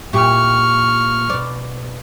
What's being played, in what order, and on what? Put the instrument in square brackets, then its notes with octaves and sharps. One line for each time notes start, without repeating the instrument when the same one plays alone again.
[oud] A#2 E4 G4 [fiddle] C#6 F6
[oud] B2 D5